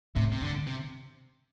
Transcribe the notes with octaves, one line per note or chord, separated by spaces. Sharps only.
A2 C3
C3
G2 D3
C3